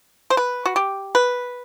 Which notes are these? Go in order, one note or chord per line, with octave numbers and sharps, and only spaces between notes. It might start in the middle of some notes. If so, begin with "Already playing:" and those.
C5
B4
F#4
G4
B4